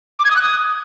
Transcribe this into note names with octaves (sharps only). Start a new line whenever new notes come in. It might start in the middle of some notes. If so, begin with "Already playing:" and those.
D6
G#6
D#6
F#6
D#6